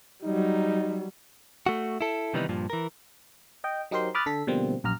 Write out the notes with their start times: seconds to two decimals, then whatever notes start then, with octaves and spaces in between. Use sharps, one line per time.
0.24 F#3 G3 D#4
1.66 A3 F#4
2.01 E4 A4
2.34 C3 D#3 E3 G3 B3 D#4
2.49 G2 A#2 F3
2.70 E3 A#4
3.64 D#5 G5
3.91 F#3 D#4 G4 A#4 C5 C6
4.15 B5 D6 D#6 F6 F#6 A6
4.26 D3 A4 B6
4.47 B2 D3 F3 G3 A#3 C4
4.84 A#1 F#2 A#5 F6